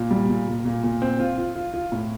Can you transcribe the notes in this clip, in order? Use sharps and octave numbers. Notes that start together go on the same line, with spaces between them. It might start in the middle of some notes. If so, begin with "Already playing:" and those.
Already playing: A#2
G3
A#2
A#2
A#2
A#2
C4
F4
F4
F4
F4
A2